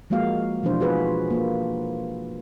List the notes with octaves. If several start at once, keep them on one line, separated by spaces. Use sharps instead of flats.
F3 G#3 A#3 F#4 F5
B2 E3 F3 D4 C5
F4 F#4 G#4 B4
A#3 F4